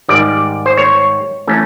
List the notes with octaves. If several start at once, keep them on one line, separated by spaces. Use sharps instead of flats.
G#2 D#3 G3 D5
C5
C#5
E3 A3 C#4